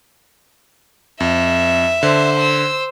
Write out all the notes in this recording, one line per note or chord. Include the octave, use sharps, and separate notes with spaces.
F2 E5
D3 C5
E6